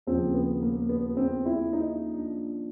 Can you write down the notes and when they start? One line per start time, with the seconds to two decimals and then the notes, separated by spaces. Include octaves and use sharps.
0.07 D#2 C#3 F3 C4
0.34 B3
0.62 A#3
0.89 B3
1.17 C4
1.46 E4
1.73 D#4
2.14 D4